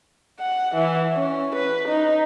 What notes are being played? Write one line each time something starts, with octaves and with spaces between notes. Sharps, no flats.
F#5
E3
C#4
B4
D#4